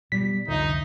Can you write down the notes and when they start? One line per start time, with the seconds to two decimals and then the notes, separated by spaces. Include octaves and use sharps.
0.12 B2 G3 B6
0.48 C2 F2 D3 D#4 C5 E5